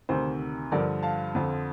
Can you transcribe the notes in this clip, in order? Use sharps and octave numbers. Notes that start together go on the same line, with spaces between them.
D2 C3 D#3 C5
G2 D3 F3 A#4 D5
F5 A5
F2 D3 F3